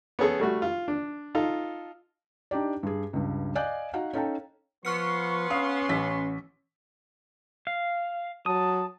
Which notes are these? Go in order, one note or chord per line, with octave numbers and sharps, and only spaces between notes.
B3 C#4 G#4 A4
G3 A3 F#4
F4
D4
D#4 F4 A4
D4 D#4 G4 D5
G2 G#4
C#2 G2
D5 D#5 F5 G#5 F#6 G6
D#4 F#4 F5 F#5
C#4 D#4 A4 F5 G5 A5
F3 B3 C6 C#6 F6 C#7
C#4 F5 D#6
A1 B6
F5
F#3 A5 D#6